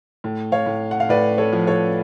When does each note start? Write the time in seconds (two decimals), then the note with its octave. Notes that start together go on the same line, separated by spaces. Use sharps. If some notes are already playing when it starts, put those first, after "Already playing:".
0.24 A2
0.52 C#5 F5
0.66 A2
0.91 F#5
1.00 F5
1.09 A2 B4 D5
1.38 A4 C#5
1.53 F3
1.67 A4 C#5